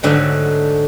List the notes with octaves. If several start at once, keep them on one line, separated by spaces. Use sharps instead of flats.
G#2 D3 F#3 A3